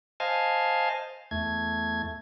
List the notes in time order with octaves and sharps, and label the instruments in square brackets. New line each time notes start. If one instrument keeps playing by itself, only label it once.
[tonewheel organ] C5 D#5 F5 G#5 A5
E2 A3 G#6